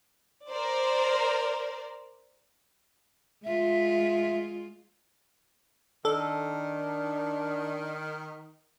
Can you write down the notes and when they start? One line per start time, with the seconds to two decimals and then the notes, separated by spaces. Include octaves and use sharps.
0.50 A#4 C5 D5
3.44 G#3 F4 E5
6.05 D#3 D4 A4